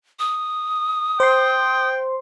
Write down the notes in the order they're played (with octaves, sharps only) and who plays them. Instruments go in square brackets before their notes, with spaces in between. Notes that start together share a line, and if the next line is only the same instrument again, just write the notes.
[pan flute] D#6
[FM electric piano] C5 C6 [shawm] G5